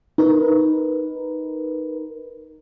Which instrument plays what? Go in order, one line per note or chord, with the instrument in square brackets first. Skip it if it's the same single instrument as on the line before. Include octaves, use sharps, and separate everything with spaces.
[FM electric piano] D#4 A#4 B4